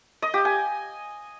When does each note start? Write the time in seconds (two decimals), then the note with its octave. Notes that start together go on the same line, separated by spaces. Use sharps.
0.22 D#5
0.34 G4
0.45 G#5